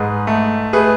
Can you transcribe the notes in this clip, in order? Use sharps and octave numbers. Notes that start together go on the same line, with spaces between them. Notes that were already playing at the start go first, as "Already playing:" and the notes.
Already playing: G#2 G#4 B4
A3
A3 G#4 B4